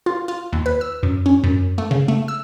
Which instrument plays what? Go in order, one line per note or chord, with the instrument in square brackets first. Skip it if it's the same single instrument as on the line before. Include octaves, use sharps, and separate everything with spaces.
[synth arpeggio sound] F4
F4
D#2
B4
E6
F#2
C#4
F#2
A3
C#3
A3
E6